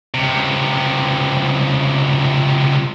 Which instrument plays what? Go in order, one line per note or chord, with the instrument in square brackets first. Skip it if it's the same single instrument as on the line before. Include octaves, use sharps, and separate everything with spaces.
[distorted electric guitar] C#2 C3